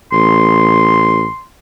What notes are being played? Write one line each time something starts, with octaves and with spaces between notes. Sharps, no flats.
A1 C6